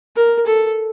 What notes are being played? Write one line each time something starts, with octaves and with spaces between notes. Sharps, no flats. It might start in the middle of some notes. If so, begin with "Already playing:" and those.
A#4
A4